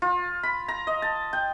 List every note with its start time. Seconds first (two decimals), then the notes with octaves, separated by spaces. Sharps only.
0.02 F4
0.43 B5
0.68 A#5
0.87 D#5
1.02 A5
1.33 G5